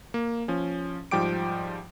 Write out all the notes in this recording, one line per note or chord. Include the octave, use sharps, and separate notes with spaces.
A#3
F3 C#4
G#2 F3 G3 G5 D6 D7